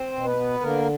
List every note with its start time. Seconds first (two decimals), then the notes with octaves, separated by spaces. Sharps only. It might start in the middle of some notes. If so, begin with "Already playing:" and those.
Already playing: C4 C5
0.12 B2
0.23 B3 B4
0.36 B3
0.61 D3 A#3 A#4